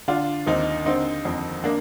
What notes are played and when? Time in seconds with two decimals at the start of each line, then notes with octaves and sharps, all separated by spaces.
0.08 D3 D4 F4
0.46 D#2 C4 D#4
0.86 D3 C4 D#4
1.25 F2
1.64 A#3 D4